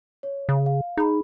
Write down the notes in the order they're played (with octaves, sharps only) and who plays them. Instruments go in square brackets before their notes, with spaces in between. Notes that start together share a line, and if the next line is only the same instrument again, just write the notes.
[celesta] C#5
[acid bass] C#3
[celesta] F5
[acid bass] D#4 [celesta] G#4 B5